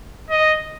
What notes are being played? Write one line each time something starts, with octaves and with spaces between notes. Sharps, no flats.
D#5